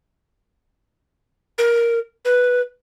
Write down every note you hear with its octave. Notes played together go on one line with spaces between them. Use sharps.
A#4
B4